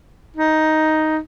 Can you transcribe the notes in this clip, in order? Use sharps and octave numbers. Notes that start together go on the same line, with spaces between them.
D#4